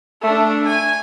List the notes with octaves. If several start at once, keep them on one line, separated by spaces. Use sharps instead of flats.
A3 D4
G#5